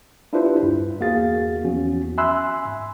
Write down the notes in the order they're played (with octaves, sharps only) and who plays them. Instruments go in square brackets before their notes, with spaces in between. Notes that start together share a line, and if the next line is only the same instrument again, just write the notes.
[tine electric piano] D4 E4 F4 G4 B4 C5
D2 G2
E2 A#3 F#4 G#4 F5 A6
E2 F3 C#4 F#4
E5 G#5 B5 C6 E6 F#6
G#2